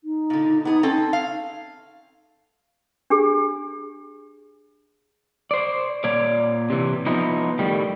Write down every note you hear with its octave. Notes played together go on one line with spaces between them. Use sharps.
D#4
A#2 D3
B3 G#4
C4 C#4 A4
F5
D4 G4 G#4
C5 D5
A#2 C#5 D5
C3 E3
F3 B3 D#4 E4
A2 D#3 G3